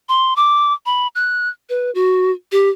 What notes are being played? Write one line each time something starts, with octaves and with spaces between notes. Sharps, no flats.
C6
D6
B5
F#6
B4
F#4
G4